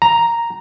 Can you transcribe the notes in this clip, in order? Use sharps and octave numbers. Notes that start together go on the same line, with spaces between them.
A#5